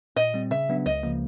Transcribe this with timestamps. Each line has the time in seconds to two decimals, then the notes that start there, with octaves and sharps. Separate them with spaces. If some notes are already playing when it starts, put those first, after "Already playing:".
0.16 A#2 D#5
0.34 G3 C4
0.51 C#3 E5
0.69 F#3 B3 D4
0.86 C#2 D#5
1.03 C#3 F3 A#3